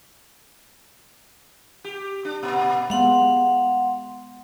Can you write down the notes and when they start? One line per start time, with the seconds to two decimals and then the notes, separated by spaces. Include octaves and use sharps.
1.84 G4
2.25 D4
2.43 A#2
2.90 G#3 B3 F5 F#5 C6